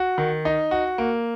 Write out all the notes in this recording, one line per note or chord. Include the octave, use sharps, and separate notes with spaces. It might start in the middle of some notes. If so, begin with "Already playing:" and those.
Already playing: F#4
D#3
D#4
F#4
A#3